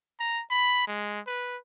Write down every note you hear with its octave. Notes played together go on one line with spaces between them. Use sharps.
A#5
B5
G#3
B4